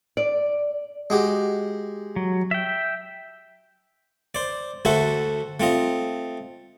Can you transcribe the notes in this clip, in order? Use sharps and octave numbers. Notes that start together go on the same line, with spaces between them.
D5
G#3 F#4 G4
F#3
E5 G5
C5 D5
D2 A3 F#4 A4 C5 E5
A3 C4 F4 D#5